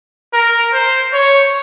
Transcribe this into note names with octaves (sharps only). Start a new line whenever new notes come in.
A#4
C5
C#5